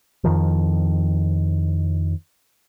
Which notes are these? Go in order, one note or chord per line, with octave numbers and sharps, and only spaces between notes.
F2 D#3 F3